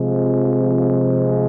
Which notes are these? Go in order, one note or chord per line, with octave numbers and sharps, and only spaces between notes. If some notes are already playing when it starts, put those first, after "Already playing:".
Already playing: C3 F3 G#3